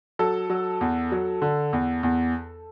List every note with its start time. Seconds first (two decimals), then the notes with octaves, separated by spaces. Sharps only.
0.19 F#3 A4
0.50 F#3
0.81 E2
1.12 F#3
1.42 D3
1.73 E2
2.03 E2